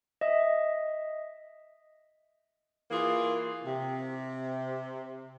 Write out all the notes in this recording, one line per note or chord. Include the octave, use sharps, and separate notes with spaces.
D#5 E5 D#6
E3 A#3 F4 G#4
C3